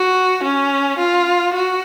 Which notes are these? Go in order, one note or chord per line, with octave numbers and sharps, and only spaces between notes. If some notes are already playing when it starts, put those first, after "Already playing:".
Already playing: F#4
C#4
F4
F#4